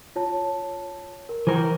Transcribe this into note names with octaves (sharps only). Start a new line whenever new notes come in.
F4 C#5 A5
A#4
E3 A#4 C5